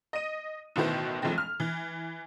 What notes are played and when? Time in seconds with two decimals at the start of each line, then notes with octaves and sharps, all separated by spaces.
0.13 D#5 D#7
0.76 A1 B2 D#3 B3 E4 C5
1.22 F1 B1 E3 F3 G#3 C4
1.38 F6
1.60 E3